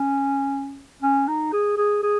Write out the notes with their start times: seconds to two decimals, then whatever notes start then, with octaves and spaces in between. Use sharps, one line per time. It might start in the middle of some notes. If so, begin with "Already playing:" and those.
Already playing: C#4
1.02 C#4
1.28 D#4
1.53 G#4
1.78 G#4
2.03 G#4